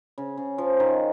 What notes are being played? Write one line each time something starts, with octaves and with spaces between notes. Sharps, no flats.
C#3
C#3
F3
D#3